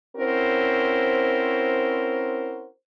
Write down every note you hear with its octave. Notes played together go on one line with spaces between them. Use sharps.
C4 C#4 E4 F#4 A#4 C5